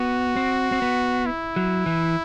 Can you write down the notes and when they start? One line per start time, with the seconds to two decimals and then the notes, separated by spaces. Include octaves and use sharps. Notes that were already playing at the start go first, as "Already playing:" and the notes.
Already playing: B3 F#4
0.37 C4
0.72 C4
0.82 B3
1.26 E4
1.56 F#3
1.86 E3